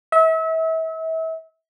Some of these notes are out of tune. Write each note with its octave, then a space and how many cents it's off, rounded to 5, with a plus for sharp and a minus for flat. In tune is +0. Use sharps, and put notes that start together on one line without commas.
E5 -35